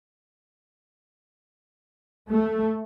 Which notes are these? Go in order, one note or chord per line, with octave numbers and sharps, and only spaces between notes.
A3